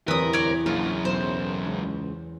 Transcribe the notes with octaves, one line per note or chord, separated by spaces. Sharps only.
D1 E2 C3 A#4 B4 D#6
C#5 D5
A#1 F#2 C#3 F4
B1 C5
C#2